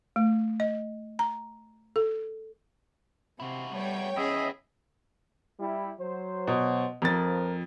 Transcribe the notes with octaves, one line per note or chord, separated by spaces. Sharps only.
A3
D#5
A#5
A4
C3 E4 F#4
G3 A3 B3 C#5 G5
B3 C#4 E4 G#4 D#5 E5
G3 E4
F#3 C5
B2
F2 F3 A#4 A6